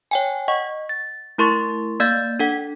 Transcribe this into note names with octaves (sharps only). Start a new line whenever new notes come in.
C#5 G5 G#5
D#5 F#5 C#6
A6
A3 E4 A#4 C6 C#6 A6
A#3 D5 F5 G6 A6
D4 A4 F#5